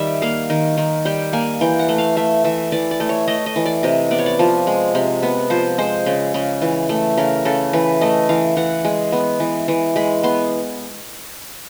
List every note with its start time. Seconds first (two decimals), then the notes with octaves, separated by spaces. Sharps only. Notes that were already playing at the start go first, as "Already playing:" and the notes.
Already playing: D#3 G3 E5
0.22 A#3 F5
0.50 D#3
0.78 D#3
1.05 G3 G5
1.33 A#3 G#5
1.61 E3 G5
1.79 F#5
1.89 A3
1.98 F5
2.16 A3 E5
2.44 E3 E5
2.72 E3 D5
2.91 D5
3.00 A3
3.09 C#5
3.27 A3 D#5
3.46 D#5
3.56 E3
3.66 D5
3.83 C3 D#5
4.11 B3 D5
4.18 C#5
4.26 D5
4.39 F3
4.67 G#3
4.95 C3
5.23 B3
5.50 F3 C5
5.78 G#3 C5
6.06 C#3
6.34 C#3
6.62 E3
6.89 A3
7.17 C#3 A#4
7.45 C#3 A4
7.73 E3 B4
8.01 A3 D#5
8.29 E3 F5
8.57 E3 F#5
8.85 G#3
9.12 B3
9.40 E3
9.68 E3
9.96 G#3 B5
10.23 B3 C6